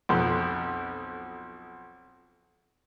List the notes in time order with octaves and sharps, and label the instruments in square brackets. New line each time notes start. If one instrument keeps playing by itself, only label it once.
[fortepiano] B1 F2 C6